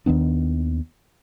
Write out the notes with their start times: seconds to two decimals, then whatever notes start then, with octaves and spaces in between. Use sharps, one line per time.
0.06 D#2 D#3 B3 D4